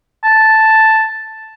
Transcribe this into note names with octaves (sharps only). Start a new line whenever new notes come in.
A5